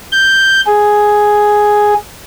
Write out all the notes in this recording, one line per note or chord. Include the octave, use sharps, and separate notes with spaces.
G6
G#4